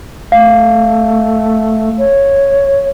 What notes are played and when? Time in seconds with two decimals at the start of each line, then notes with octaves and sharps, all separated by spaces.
0.32 A3 F5
1.98 C#5